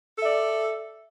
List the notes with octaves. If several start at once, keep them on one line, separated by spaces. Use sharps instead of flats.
A4 D5 E5